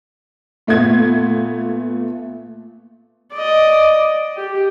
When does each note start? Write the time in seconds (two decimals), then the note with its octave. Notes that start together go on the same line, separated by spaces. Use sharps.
0.67 A#2 A3 B3 F4 G#6
3.34 D5 D#5
4.37 G4